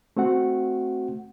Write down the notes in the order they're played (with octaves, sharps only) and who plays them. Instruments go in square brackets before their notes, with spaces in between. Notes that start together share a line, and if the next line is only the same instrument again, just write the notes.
[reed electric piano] A3 C4 F#4 F#5